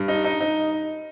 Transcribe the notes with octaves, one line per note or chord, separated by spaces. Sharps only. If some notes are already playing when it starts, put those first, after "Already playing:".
Already playing: G2
D#4
D#4
D#4